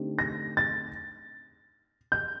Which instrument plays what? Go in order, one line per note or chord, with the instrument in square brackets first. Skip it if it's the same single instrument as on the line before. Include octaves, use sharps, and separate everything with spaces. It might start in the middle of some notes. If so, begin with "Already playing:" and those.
Already playing: [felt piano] D3 A3 C4 D#4 G4
[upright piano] A#6
A6
G6